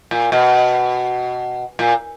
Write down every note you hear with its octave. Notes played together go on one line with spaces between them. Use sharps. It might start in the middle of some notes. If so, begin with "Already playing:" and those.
A#2
B2
A#2